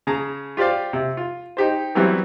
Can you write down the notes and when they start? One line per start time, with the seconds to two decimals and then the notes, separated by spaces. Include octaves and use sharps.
0.07 C#3 G#4 A5 A#5
0.57 F4 G4 C5 D5 F5
0.93 C3
1.17 F4
1.57 D#4 G4 C5
1.95 E3 F#3 G3 B3 C4 E4